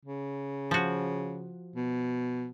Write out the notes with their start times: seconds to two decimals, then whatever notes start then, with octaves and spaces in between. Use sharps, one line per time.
0.05 C#3
0.71 F3 F#4
1.76 B2